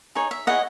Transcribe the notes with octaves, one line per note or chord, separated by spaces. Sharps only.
D#4 G#4 C#5
E5
E4 G#4 C#5 D#5 F#5